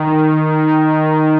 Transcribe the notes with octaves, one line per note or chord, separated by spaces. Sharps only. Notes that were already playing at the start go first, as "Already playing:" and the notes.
Already playing: D#3